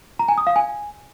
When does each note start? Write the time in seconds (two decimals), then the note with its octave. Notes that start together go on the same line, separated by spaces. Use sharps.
0.19 A#5
0.29 G#5
0.38 D#6
0.47 F5
0.56 G#5